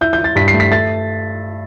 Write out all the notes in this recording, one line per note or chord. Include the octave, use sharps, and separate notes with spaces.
E4 G6
G6
E4
A6
G2 B6
C7
A3
B6
A3 A6